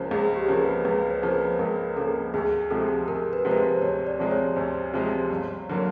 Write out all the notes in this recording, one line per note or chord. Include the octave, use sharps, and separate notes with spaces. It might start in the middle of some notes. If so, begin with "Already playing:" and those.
Already playing: C#2 C#3 F3 A#3 C5
C#2 G#4
G4
C#3 F3 A#3
B4
C#2 B4
C5
C#3 F3 A#3
B4
C#2 A#4
C#3 F3 A#3 A4
D2 G#4
C3 F3 G#3 A4
D2 A#4
B4
C3 F3 G#3
B4
C5
D2 C#5
D5
C3 F3 G#3
C#5
D2 C5
C3 F3 G#3
G1
D3 F#3 A#3